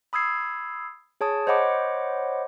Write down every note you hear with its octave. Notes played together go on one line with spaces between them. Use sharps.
B5 D#6 E6 G#6 C7
G#4 C#5 A5 D#6
C5 C#5 D#5 F#5 B5 D6